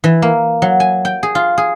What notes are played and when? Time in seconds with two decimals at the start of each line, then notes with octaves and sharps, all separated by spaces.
0.04 E3
0.22 A#3
0.62 F#3
0.80 G#5
1.05 G5
1.23 G#4
1.35 F4
1.58 G#4